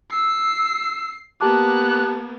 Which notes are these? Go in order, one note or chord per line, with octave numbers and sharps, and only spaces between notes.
E6 C7
A#3 B3 G4 A5 D6 F#6